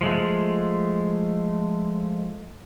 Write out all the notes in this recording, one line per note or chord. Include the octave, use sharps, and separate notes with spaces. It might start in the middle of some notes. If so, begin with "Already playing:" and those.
F3 G#3 A3